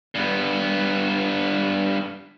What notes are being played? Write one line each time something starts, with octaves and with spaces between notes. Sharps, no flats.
G2 B3